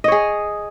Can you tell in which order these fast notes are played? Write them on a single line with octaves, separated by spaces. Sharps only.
D#5 C#5 G#4